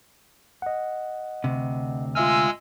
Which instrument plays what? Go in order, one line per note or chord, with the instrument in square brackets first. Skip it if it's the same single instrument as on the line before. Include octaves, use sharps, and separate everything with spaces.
[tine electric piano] D#5 F#5
[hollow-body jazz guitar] D2 C3
[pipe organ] G#3 G#5 E6 [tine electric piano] F4 E5 F6